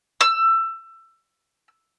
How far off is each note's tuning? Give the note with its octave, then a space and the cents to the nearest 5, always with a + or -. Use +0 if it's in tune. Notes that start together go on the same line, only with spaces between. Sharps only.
E6 +20